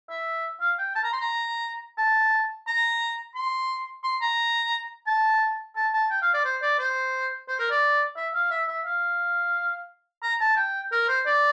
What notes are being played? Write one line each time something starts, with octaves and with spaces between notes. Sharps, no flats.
E5
F5
G5
A5
A#5
C6
A#5
A5
A#5
C6
C6
A#5
A5
A5
A5
G5
F5
D5
C5
D5
C5
C5
A#4
D5
E5
F5
E5
E5
F5
A#5
A5
G5
A#4
C5
D5